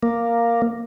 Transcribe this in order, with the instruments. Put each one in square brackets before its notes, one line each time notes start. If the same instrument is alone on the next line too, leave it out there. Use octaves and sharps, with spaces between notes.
[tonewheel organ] A#3